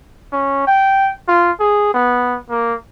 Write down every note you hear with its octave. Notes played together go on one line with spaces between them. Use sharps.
C#4
G5
F4
G#4
B3
A#3